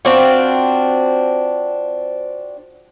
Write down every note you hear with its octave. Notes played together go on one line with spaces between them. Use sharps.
C4 D4 F4 F#4